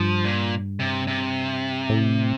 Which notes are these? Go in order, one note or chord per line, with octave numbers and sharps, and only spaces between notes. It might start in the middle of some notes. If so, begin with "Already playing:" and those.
Already playing: G2 F3
A#2
C3
C3
A2